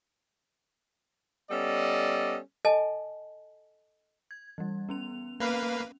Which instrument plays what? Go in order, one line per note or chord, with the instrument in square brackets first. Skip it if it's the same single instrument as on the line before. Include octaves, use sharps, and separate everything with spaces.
[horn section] G3 B3 C#4 A4 D5 D#5
[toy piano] A4 D#5 G#5 A5
[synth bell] G#6
E3 G3
B3 C#4 F7
[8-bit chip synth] A#3 B4 F5